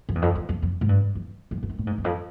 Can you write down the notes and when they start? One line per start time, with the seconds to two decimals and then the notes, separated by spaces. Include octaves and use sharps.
0.09 F2
0.15 E2
0.22 F2
0.35 E2
0.49 F2
0.62 F2
0.81 G#2
0.89 G2
1.15 F2
1.51 F2
1.63 G2
1.69 F#2
1.78 A2
1.87 G#2
1.98 E2
2.04 F2